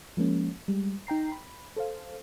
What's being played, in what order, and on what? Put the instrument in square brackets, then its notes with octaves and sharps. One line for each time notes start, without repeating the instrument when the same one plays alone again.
[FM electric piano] F3 G#3 A#3 C#4
G3 G#3
D#4 G5 A#5 C7
B5
A4 C5 F5